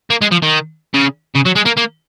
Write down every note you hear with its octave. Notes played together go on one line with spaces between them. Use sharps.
A#3
G#3
F3
D#3
C#3
C#3
F#3
G#3
A#3
A#3